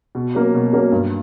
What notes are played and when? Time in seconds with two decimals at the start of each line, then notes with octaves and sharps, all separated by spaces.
0.15 B2
0.35 F#3 A#3 C#4
0.54 B2
0.73 F#3 A#3 C#4
0.92 G2